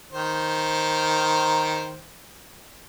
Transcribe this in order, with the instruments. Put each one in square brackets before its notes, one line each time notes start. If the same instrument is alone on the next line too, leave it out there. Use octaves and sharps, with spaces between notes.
[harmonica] D#3 C5